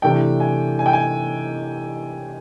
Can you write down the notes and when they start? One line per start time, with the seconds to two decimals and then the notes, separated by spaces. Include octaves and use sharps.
0.02 C3 E3 A3 D4 G5
0.40 G#5
0.79 G#5
0.86 G5
0.93 G#5